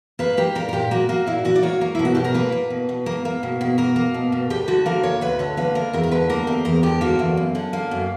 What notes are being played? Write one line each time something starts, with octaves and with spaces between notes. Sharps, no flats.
A#3 B4
A#3 G4
A#2 A#4
A#4
A#2 G4
A#3 F#4
A#3 F#4
A#2 E4
A#2 F#4
D5
A#3 C#5
A#3
B2 E4
F#4
B2 G4
A#4
A#3 B4
A#3
B2
B2
A#3
A#3
B2
B2
A#3 A#4
A#3
B2
B2
D2 G4
D3 F#4
A#3 A#4
D2 C#5
D2 B4
D3 C#5
A#3 B4
D2 A#4
E2 A#4
A#4
D3 B4
A#3 A#4
E2 G4
E2 A#4
D3 G4
A#3 F#4
E2
F#2
D3
A#3
F#2